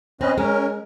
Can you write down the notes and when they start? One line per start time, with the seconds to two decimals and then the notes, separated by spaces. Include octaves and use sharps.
0.21 C4 C#4 B4 D#5
0.38 G#3 C#4 A#4